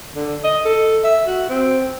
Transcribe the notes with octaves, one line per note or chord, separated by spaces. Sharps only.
D3
D#5
A4
E5
F#4
C4